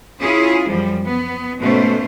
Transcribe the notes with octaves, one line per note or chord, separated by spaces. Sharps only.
C#4 E4 F4 G#4
F#2 F3 G3
B3
G#2 B2 A3 C#4 C5